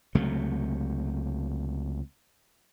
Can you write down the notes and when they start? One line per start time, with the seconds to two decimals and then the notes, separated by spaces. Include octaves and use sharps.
0.15 C#2 C3 F#3 A3